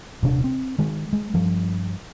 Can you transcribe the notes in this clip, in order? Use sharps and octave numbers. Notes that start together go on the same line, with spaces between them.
D#1 C3 C#4 D4
C4
D#3 G#3
G#3
G2 F3